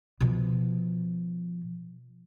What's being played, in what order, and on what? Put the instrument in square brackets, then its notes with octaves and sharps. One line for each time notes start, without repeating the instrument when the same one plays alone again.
[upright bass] B2 F3